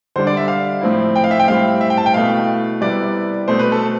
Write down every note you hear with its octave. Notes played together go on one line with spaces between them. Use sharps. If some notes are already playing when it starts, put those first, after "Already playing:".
D3 G3 D4 C5
D5
E5
F5
A2 F3 C4 E4
G5
F5
E5
G5
A2 G3 C4 E4 F5
E5
G5
A5
G5
B2 A3 E4 F5
C3 G3 B3 E4 D5
B2 A3 C4 C5
B4
A4